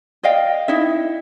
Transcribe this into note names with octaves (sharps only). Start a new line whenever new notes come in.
D5 D#5 F5 G5
D#4 E4 E5